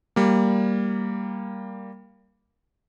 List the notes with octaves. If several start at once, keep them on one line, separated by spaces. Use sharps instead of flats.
G3 A#3